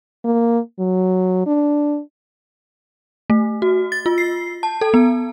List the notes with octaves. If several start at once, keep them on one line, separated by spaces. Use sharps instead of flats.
A#3
F#3
D4
A3
F#4
A6
F4
C7
A5
A4
B3